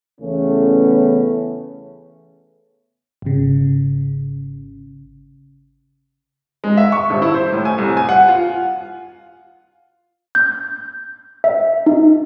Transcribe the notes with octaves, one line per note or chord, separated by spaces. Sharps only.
E2 C#3 E3 A3 B3 C#4
G#1 C#3
G#3
E5
C#6
D#1
E4
C5
A2
G#5
C2
G#5
F#5
F4
G6
E5
D#4